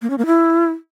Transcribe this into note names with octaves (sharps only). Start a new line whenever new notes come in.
A#3
C#4
A#3
E4